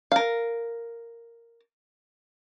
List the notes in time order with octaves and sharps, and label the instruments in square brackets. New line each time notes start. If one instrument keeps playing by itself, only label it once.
[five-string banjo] A#4 F5